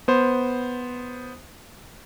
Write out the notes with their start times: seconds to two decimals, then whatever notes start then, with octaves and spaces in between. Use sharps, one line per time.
0.08 B3 C5